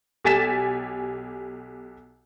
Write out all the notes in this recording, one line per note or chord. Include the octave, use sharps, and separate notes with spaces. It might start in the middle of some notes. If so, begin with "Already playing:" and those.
B1 G4 G#5 A6 B6 E7